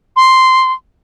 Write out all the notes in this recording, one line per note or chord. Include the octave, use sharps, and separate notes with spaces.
C6